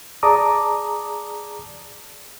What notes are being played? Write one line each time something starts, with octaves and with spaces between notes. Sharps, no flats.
G#4 D5 A5 A#5 D6 D#6